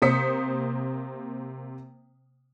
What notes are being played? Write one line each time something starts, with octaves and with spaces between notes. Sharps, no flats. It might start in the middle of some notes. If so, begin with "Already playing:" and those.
C3 A#3 C5 D#6 B6 C#7